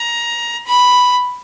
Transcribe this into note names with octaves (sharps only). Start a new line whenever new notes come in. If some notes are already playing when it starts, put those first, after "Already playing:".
Already playing: A#5
B5